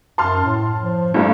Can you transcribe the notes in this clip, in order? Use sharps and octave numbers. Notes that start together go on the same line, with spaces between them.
F#2 A5 C6 F6
A2
F3
G2 A3 A#3